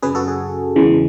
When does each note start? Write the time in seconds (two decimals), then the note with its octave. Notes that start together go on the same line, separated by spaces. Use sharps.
0.02 F#2 C#3 F#3 C#4 G#4 B4
0.15 F#4 A4
0.28 G#4
0.76 E2 C#3 E3 G#3